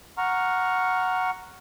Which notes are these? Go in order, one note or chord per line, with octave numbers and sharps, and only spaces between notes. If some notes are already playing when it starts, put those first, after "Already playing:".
F#5 A#5 C#6 F6